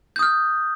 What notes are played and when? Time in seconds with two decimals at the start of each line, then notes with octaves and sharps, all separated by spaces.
0.16 G6
0.19 D#6
0.23 F6